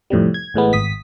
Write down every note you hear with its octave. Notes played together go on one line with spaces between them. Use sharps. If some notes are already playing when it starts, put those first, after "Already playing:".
F2 A2 C3 G3
G#6
A1 A2 G#3 B3
G#1 D#6 B6